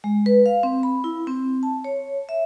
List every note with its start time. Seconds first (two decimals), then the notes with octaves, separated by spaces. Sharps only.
0.04 G#3
0.26 B4
0.46 F5
0.63 C4
0.83 B5
1.04 E4
1.27 C4
1.63 A5
1.84 C#5
2.29 E5